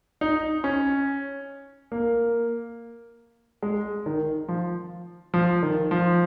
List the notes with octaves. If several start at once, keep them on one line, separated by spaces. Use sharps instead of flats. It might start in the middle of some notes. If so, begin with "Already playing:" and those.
D#4
C#4
A#3
G#3
D#3
F3
F3
D#3
F3